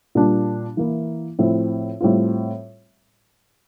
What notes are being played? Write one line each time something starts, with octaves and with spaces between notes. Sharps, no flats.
A#2 G3 D4 F4
E3 A#3 E4
A2 F3 C4 E4
A2 G3 C4 F4